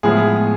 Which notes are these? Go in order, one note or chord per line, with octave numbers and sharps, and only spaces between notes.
A2 F3 G#3 B3 G#4